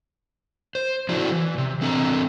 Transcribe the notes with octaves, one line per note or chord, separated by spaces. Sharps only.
C5
F3 D4 E4 F#4 A4
E3
C3
E3 C4 D4 A4 D#5 A#5